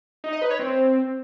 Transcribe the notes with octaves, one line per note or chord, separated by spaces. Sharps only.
D#4
D#5
B4
C#5
C4